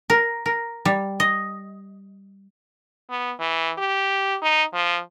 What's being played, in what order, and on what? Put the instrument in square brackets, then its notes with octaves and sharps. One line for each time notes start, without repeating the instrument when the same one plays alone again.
[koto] A#4
A#4
G3
D#5
[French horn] B3
E3
G4
D#4
F3